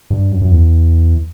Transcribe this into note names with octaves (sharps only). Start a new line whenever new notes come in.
G2
F#2
F#2
E2